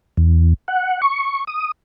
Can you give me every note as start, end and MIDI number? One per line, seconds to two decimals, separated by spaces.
0.17 0.54 40
0.68 1.01 78
1.02 1.44 85
1.47 1.71 87